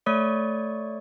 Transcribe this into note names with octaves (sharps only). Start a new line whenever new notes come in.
A3 C#5 D5 C#6